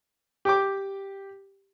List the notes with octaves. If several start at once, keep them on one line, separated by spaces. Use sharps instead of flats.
G4 G5 D6